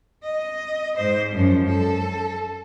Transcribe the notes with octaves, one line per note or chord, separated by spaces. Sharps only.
D#5
G#2 C5
F#2 F3
A4